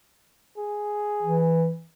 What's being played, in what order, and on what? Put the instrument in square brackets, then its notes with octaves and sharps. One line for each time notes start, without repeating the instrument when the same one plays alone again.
[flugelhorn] G#4
[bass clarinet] E3